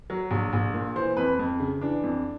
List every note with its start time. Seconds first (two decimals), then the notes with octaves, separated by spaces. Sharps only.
0.10 F#3
0.31 A#1
0.53 A#1
0.74 A#2
0.96 E3 C5
1.17 F2 B4
1.39 F2
1.60 C#3
1.81 E3 D4
2.03 F2